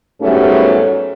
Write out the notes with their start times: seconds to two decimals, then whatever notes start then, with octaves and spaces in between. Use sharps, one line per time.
0.21 G#2 F#3 G3 A3 B3 C#4